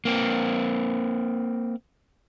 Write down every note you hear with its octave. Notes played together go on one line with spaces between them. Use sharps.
A#3 C4